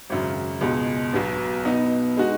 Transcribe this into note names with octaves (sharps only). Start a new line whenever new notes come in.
G#1 F#2 C#3
C#2 B2 G#3
B1 B2 F#3 B3
B2 B3 D#4
G#3 D#4 F#4